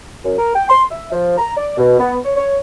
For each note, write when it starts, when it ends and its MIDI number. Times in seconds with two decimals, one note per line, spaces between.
0.24 0.38 42
0.38 0.50 70
0.54 0.67 79
0.69 0.84 84
0.90 1.08 76
1.12 1.35 53
1.38 1.52 82
1.56 1.73 74
1.77 1.99 47
1.99 2.17 59
2.24 2.33 73
2.36 2.56 73